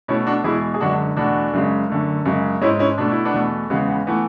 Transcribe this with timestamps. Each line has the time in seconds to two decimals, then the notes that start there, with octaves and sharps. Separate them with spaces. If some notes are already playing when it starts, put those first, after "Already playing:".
0.08 B2 A3 C#4 E4
0.26 D4 F#4
0.44 E2 B2 G#3 E4 G#4
0.74 G#4
0.80 F#2 D3 G#3 D4 F#4
1.16 E2 B2 A3 D4 F#4
1.53 F#2 C#3 G#3
1.89 F#2 D3 A3
2.25 F#2 C#3 G#3
2.61 G#2 G#3 C#4 E4
2.79 C#4 E4
2.98 B2 A3 D4
3.11 E4
3.25 B3 D4
3.34 E2 B2 A3
3.70 E2 C#3 G#3 B3
3.88 B3
4.07 E3 A3 B3